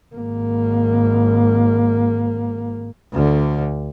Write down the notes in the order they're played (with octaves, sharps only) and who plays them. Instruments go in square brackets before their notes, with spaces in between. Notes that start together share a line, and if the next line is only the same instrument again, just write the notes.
[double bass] G#1 A#3
D2 D3